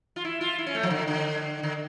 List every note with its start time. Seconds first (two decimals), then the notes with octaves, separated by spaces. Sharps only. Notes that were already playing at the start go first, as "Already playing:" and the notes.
0.16 F4
0.25 E4
0.41 F4
0.58 E4
0.67 C#4
0.75 A3
0.83 F3
0.90 D3
1.08 D3
1.63 D3